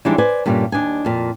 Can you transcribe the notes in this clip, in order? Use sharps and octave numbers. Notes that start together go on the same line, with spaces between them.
E3 F3 G3 G#3 D4 D#4
B4 C5 D5 G#5
G2 A#2 D3 G3 C#4
D#2 D4 D#5 G#5
F2 A#2